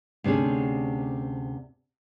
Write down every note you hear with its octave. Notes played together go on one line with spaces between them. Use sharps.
D2 C3 C#4 D4 G#4